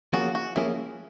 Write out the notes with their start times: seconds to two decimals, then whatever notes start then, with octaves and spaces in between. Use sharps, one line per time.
0.13 F3 A#3 C#4 F4 F#4 G#4
0.35 F#4
0.56 F3 A#3 C#4 E4 F4 G#4